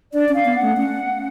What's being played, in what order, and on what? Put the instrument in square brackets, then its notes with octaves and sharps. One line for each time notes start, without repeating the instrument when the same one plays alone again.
[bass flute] D4 [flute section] D5
[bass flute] C#4
[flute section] F5
[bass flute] B3
[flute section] F#5
[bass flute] A3
C#4
C#4